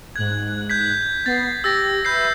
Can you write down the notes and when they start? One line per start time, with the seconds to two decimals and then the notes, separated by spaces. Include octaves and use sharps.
0.16 G#2 F#6 G#6
0.70 G6 G#6 B6
1.26 B3 A6 C7
1.64 G4 E6 A6 A#6
2.05 B4 E5 G6 C7